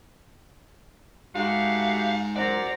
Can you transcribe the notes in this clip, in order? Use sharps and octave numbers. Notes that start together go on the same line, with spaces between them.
G#2 A3 F#4 G4 F5
F#2 C5 D5 F#5 A#5